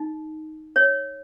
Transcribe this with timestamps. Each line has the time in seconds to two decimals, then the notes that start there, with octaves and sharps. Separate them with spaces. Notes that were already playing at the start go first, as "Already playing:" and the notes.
Already playing: D#4
0.76 C#5